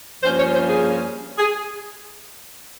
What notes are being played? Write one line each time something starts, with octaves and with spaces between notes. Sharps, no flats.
G2 F3 A#3 C#4 C5
C#5
C5
G#4
G#4